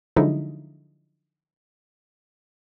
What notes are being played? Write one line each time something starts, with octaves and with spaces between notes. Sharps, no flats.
D3 F3 F#3 G#3 D#4 E4